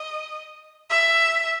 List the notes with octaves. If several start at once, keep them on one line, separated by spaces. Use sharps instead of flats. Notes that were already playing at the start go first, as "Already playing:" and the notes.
Already playing: D#5
E5